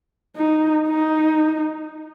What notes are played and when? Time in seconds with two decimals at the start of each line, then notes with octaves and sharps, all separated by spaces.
0.36 D#4
0.88 D#4